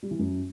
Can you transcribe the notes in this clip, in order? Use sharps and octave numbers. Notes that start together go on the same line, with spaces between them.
G3
E3
F#2